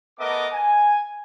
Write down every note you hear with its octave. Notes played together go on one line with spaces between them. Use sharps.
A3 B3 A4 A#4 D#5 D6
G#5